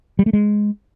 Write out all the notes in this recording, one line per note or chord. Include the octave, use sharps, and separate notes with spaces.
G3
A3
G#3